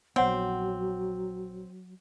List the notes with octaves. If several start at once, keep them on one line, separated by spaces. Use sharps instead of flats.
A#1 F#3 B3 C4 C#5 F#5